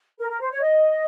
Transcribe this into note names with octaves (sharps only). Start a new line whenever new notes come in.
A#4
A#4
C5
C#5
D#5